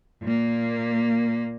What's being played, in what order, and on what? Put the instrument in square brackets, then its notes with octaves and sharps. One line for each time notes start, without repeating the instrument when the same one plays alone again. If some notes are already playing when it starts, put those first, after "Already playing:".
[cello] A#2 A#3